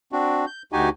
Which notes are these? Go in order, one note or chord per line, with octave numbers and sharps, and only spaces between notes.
C4 D4 F#4
G6
D2 D#4 F#4 G4 G#5